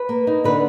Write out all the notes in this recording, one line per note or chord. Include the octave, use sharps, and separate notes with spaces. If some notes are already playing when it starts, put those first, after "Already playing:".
Already playing: B4
A#3
D#4
D3 B4